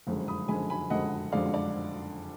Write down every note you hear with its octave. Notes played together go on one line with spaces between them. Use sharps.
F#1 F2 D3 G#3
B5 D#6
F#1 F2 D3 G#3 G#5 B5
G#5 B5
F#1 F2 D3 G#3 D#5 F#5
F#1 F2 D3 G#3 D5 F5
D5